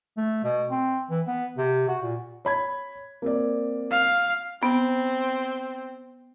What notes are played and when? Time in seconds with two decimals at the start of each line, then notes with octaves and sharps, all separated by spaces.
0.17 A3
0.44 B2
0.71 C4
1.10 E3
1.27 B3
1.58 C3
1.88 F#4
2.03 A#2
2.45 C#5 B5 G#6
3.22 A#3 C4 D5
3.91 F5
4.63 B3 C4